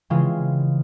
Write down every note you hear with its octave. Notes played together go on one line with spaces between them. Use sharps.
C#3 E3 G#3 C4 F4 G#4